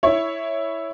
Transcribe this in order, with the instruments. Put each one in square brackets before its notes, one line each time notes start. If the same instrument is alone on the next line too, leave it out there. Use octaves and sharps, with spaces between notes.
[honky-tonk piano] E4 C#5